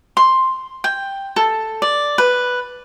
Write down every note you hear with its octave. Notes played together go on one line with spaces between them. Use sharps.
C6
G5
A4
D5
B4